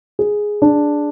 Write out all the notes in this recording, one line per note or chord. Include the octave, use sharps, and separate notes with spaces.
G#4
D4